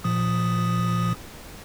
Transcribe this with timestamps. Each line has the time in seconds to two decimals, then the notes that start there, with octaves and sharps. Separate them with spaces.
0.04 A#2 F3 D#6